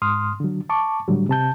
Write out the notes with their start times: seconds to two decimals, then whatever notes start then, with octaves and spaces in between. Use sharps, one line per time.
0.02 G#2 C6 D#6 F6
0.40 D3 F#3
0.70 A5 C#6 D6
1.08 A2 D3 F#3 G3
1.29 C3 A5 G6